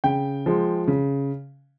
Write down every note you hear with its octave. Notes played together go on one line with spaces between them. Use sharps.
C#3 G5
F3 G#3
C#3